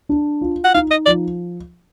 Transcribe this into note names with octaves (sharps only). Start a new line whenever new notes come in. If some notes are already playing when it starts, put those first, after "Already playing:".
D4
F4
F#5
D#4 F5
D#5
F3 D5